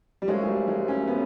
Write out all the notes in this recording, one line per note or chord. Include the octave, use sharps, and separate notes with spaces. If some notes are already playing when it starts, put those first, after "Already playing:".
G3
F#2 C#3 F3 G#3 A3
G#3
G3
G#3
C#4
B3